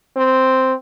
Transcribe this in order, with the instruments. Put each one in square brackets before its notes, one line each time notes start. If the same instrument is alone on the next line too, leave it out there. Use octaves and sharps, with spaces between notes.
[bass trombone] C4